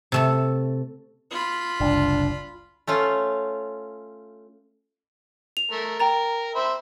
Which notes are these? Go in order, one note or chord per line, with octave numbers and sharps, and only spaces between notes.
C3 A3 A4
F4 B5
F#1 C2 D4
A3 C#4 F4 F5
F7
A3 A#4
A#4 G5 A#5 A6
C5 E5 B5